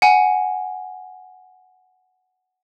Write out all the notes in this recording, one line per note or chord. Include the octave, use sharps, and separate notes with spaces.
F#5 G#5